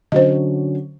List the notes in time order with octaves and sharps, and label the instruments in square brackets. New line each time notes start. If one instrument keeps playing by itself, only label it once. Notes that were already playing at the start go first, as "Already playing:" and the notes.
[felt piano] D3 F#3 C#4 [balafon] C5 D#5